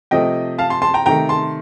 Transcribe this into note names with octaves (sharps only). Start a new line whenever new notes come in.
C3 F3 A3 D#5 G5
F5 A5
A5 C6
A5 C6
G5 A#5
C3 D#3 A3 G5 A#5
A5 C6